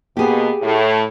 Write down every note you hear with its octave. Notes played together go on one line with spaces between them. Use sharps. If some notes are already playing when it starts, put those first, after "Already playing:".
B2 A#3 B3 G4 G#4
A2